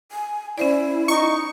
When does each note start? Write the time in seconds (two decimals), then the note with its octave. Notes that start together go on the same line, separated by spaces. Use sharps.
0.12 G#5
0.58 C#4 E4 C5 D5
1.08 D#4 C#6